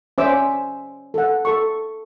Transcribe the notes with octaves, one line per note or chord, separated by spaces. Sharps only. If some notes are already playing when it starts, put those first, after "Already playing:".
C#4 C5 D5 E5 D6 E6
A4 F#5
A4 C#6